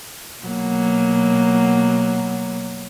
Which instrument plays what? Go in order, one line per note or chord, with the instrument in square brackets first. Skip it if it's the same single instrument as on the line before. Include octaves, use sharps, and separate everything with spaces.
[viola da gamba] B2 F#3 A#3